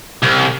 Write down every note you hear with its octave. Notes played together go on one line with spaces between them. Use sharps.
C2